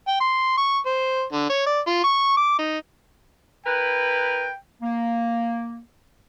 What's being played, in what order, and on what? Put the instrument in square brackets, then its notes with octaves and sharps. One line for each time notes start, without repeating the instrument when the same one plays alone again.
[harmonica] G5
C6
C#6
C5
D3
C#5
D5
F4
C#6
D6
D#4
[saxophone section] E4 A#4 B4 [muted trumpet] G5
[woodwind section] A#3